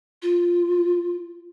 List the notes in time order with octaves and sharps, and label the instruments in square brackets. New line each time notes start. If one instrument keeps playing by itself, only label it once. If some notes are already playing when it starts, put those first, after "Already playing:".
[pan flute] F4